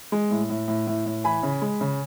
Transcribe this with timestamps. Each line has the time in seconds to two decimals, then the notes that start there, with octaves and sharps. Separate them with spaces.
0.12 G#3
0.31 A2
0.50 A2
0.68 A2
0.87 A2
1.06 A2
1.24 E3 G#5 B5
1.43 C#3
1.62 G#3
1.81 C#3